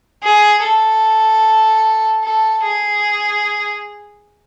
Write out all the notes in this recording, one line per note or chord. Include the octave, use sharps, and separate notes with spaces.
G#4
A4
A4
G#4